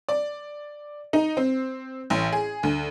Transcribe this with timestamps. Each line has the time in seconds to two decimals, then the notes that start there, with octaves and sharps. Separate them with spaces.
0.09 D5
1.13 D#4
1.37 C4
2.10 A1
2.32 G#4
2.63 D2